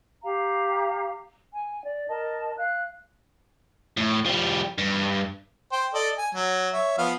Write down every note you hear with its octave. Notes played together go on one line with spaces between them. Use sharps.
G4 F5 A#5
G#5
D5
A#4 D#5 A5
F5 F#6
A2
F3 G3
G2
C5 G5
A4 D5 D#5
G#5
F#3
C#5 E5
F3 B3 F5